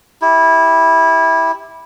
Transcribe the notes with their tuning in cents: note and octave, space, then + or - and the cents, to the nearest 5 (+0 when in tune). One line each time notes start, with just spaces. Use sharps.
E4 -15 G4 +5